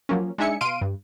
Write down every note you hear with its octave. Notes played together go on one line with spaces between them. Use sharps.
F3 F#3 A#3 C#4
G#3 D4 D#4 E5 G#5 C#7
B2 F5 C6 D7 D#7
G2